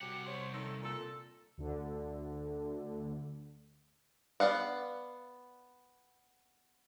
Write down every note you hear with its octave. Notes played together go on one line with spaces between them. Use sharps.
C2 F#3 G4 F#5
C5 C#5
D#3 A4
A#2 A4
D2 D3
B3 D5 F5 F#5